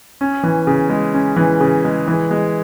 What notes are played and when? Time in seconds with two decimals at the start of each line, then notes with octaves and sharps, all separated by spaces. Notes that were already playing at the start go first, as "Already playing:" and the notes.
0.21 C#4
0.43 E3
0.67 C#3
0.90 G#3
1.14 C#4
1.36 E3
1.60 C#3
1.84 G#3
2.08 E3
2.31 G#3